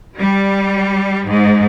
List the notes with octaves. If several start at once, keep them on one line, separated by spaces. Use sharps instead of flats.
G3
G#2